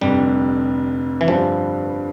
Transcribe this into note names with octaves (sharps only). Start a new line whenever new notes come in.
F1 F2 D3 G3
E3
G2 D3 F3 G3 D4